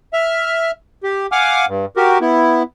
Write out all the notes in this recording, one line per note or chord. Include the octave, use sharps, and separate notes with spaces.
E5 F6
G4
F5 F#5 G#5 D6 F6
G2
F#4 G4 A#4
B3 E4